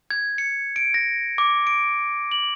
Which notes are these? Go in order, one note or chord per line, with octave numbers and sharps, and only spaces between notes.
G#6
C#7
D7
A#6
D6
D7
F#7